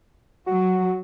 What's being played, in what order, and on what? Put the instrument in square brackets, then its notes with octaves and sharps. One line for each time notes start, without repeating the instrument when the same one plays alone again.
[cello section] F#3 [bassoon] F#4